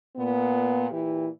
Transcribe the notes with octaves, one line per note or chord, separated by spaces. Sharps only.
A#2 B3
A#2 E3 E4 G4